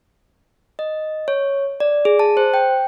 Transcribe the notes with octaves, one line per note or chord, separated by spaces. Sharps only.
D#5
C#5
D5
G#4
A5
C5
G5